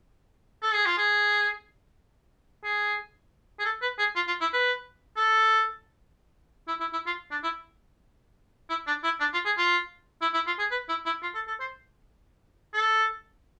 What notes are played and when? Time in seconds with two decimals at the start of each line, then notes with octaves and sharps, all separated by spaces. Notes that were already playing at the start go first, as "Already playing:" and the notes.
0.62 A4
0.74 G#4
0.86 F4
0.97 G#4
2.64 G#4
3.59 G#4
3.65 A4
3.82 B4
3.99 G#4
4.16 F4
4.28 F4
4.41 E4
4.53 B4
5.17 A4
6.68 E4
6.80 E4
6.93 E4
7.06 F4
7.31 D4
7.43 E4
8.69 E4
8.87 D4
9.04 E4
9.20 D4
9.33 F4
9.45 G#4
9.58 F4
10.22 E4
10.34 E4
10.47 F4
10.59 G#4
10.71 B4
10.89 E4
11.06 E4
11.22 F4
11.35 A4
11.48 A4
11.60 C5
12.74 A4